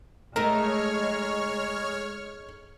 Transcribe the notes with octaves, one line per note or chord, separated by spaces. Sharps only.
G#3 A3 D#4 A#4 C#5 D#5 F6